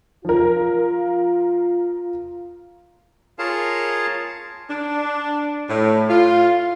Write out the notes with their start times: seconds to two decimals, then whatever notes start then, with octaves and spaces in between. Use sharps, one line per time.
0.25 F3 F4 A#4
3.39 F4 G#4 A#4 C#5 F5 A5
4.69 D4
5.68 A2
6.09 F4